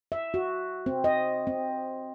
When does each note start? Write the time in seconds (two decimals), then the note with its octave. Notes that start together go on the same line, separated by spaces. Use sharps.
0.12 E5
0.34 F#4
0.86 C4
1.04 D#5
1.47 C4